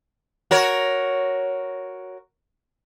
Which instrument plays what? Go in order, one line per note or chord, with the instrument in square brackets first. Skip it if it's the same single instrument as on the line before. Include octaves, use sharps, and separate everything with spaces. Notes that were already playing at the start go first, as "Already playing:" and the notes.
[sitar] F#4 A#4 C#5